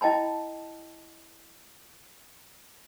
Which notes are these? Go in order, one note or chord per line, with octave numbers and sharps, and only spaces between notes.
E4 D#5 G5 A5 B5